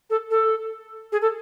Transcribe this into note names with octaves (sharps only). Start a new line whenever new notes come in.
A4
A4
G#4
A4